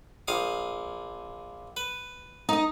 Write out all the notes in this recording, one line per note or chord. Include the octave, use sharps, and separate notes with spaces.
A#1 F5 D#6
B4
D#4 D#5